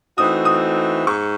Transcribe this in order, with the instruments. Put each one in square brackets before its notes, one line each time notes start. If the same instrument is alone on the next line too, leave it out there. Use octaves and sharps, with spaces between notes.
[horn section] E3 A3 C4 D#4 F#4 [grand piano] D#6
[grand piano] D#6
[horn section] G#2 [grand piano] C#6